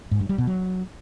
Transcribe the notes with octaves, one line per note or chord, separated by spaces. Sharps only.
G#2
G2
G3
B2
F#3